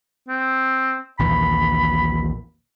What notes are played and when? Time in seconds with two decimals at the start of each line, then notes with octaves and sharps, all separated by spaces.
0.28 C4
1.19 A#1 D#2 E3 B5